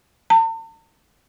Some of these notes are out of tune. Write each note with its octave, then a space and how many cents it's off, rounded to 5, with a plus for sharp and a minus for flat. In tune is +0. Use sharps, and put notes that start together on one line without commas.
A5 +45